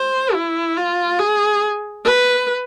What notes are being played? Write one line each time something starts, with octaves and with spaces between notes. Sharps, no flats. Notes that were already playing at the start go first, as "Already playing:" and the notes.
Already playing: C5
E4
F4
G#4
B4